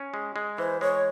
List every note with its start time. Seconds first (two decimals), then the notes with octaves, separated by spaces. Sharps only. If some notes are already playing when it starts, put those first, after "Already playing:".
Already playing: C#4
0.14 G#3
0.36 G#3
0.58 E3 C5
0.81 G#3 C#5